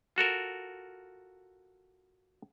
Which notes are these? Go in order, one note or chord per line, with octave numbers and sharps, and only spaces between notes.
F4 F#4 A4 A#4